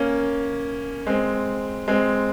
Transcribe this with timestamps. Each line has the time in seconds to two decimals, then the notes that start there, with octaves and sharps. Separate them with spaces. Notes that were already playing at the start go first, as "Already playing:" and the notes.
Already playing: A#3 C#4
1.07 G#3 C4
1.88 G#3 C4